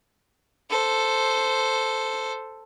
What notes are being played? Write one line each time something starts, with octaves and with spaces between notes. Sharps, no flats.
A4 C5